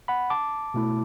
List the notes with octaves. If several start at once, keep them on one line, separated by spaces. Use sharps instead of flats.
F#5 B5
A5 D6
B2 A3 E4